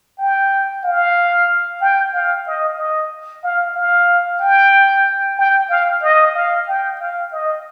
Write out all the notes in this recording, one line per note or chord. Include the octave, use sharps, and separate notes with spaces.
G5
F5
G5
F5
D#5
D#5
F5
F5
G5
G5
F5
D#5
F5
G5
F5
D#5